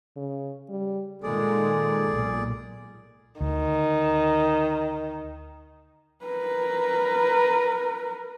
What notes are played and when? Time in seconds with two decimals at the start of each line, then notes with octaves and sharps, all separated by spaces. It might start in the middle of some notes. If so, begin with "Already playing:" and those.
0.16 C#3
0.69 G3
1.23 A#2 D#3 G#3 G#4 A4 D5
2.08 B1 A#2
3.41 D2 D#3
6.25 A#4 B4